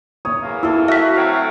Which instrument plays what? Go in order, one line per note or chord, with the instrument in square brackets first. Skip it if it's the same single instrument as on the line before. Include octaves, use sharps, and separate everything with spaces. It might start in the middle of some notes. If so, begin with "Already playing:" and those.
[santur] C#5 [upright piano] D#6
[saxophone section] E2 A#3
[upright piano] E4 [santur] A4 E6
[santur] F#4 [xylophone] E5 B6
[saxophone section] F#3 A3 C4 [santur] F5